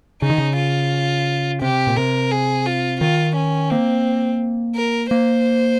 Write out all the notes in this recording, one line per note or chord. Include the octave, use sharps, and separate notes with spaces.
C#3 D#4
D#3
C#3
F4
C3 G4
A#2
C3 A#4
G#4
F4
D#3 F4
C#4
A#3 C4
A#4
A#3 C5